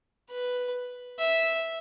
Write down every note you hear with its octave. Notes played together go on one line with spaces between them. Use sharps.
B4
E5